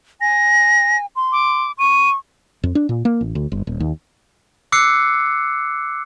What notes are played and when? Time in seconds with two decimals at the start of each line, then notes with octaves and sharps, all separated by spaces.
0.21 G#5 A#6
1.16 C6
1.32 D6
1.79 C#6 D#7
2.63 F2
2.75 D4
2.89 A#2
3.05 A#3
3.21 A1
3.35 D2
3.52 G1
3.67 D#1
3.80 D#2
4.72 D6 E6 F#6 C7 C#7